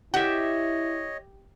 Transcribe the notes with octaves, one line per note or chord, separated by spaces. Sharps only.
E4 G4 C#5 D#5 E5 F#5